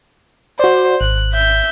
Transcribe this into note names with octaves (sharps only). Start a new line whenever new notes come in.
F#4 C5 D5
G#1 F#6
E5 G6